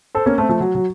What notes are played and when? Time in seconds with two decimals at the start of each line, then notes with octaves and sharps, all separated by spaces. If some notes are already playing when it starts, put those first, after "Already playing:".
0.15 A4 C5
0.26 A#3 C#4
0.38 A3 C4
0.49 F3 A3
0.60 F#3
0.75 F#3